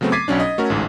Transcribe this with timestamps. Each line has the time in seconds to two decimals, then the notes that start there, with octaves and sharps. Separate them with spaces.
0.01 C#3 F#3 A3 B3 C4
0.12 D6 G#6 A6 B6 C7 D#7
0.28 B1 F#3 C#4 D4
0.40 D#5
0.58 A3 C#4 F#4 A4 A#4
0.70 A1 D2 G#2